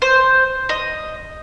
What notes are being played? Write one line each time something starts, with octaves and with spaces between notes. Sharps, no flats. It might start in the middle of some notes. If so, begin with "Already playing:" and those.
C5
D#5